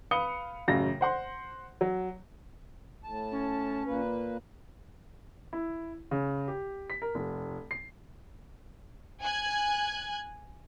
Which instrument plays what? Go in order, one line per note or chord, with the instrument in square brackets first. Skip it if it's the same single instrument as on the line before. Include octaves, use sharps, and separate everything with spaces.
[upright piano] B4 F5 D#6 C#7 G7
A1 F#2 C#3 F5 A#6
C5 F#5 C6
F#3
[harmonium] A2 A5
[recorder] C#4
[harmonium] A#2 A#3 B4
[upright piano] E4
C#3
G4
B6
A#4
F1
C7
[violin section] G#5 F#6 G#6